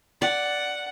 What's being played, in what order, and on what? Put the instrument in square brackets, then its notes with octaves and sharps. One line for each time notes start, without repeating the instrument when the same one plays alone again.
[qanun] D5 [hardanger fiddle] F#5